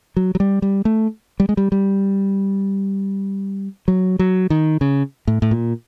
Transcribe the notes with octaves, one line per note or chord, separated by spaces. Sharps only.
F#3
F#3
G3
G3
A3
G3
G#3
G3
G3
F#3
F#3
D#3
C#3
A2
A2
A#2